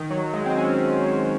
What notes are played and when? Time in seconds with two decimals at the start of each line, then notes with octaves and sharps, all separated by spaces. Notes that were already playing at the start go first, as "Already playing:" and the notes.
Already playing: D#3
0.11 F#3
0.33 G#3
0.46 C4
0.57 C#4